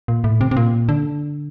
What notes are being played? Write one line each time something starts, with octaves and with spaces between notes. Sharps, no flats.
A#2
A2
C3
C3
A#2
D3